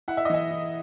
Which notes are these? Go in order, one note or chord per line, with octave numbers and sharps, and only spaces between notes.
E4 F#5
E5
D#5
E3 E5
E4